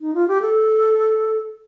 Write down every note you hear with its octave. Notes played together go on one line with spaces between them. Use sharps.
D#4
F4
G4
A4